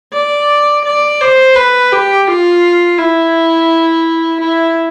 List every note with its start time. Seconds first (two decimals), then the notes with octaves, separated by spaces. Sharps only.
0.13 D5
0.85 D5
1.21 C5
1.56 B4
1.92 G4
2.28 F4
2.98 E4
4.41 E4